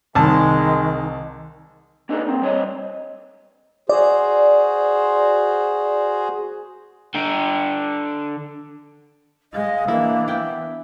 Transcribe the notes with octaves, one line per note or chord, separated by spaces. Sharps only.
C2 D#3 G#3 A5
A#3 B3 D4 D#4 G#4 A4
A#3 C4
G3 C5 C#5 D#5
F#4 G#4 C5 D5
D3 G5
G#3 D#5 F5
E3 A#3 D4 E4
B3 E4 G5